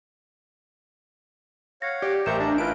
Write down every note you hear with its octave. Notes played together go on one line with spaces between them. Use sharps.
C#5 F5 F#5 A#6
G4 D5
A1 A#4 C5 E5 A#5 C#6 G6 E7
D4 A#5
E4 F4 B4 D7